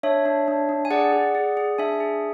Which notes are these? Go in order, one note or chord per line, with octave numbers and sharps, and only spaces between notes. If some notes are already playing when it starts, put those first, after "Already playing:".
D4 C#5 E5
D4
D4
D4
G#5
G#4 D5 F#5
G#4
G#4
G#4
D4 E5 G#5
G#4